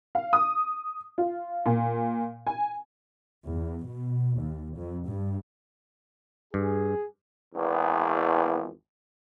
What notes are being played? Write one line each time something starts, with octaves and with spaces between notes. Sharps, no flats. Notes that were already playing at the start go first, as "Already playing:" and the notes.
F5
D#6
F4
A#2
G#5
E2
B2
D#2
F2
G2
G2 G#4
G#1 E2